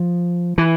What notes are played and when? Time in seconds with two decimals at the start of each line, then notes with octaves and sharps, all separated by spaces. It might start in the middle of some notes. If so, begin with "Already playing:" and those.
Already playing: F3
0.58 E3